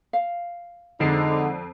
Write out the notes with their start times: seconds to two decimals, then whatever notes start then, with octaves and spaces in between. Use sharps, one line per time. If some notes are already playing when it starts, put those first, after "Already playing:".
0.13 F5
1.00 F2 D3 G#3 D#4 C7